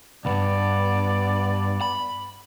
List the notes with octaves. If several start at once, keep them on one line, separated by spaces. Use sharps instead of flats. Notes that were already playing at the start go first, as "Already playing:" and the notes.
C2 G2 B3 D5
B5